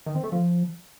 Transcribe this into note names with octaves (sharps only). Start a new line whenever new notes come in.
D#3
C4
A3
F3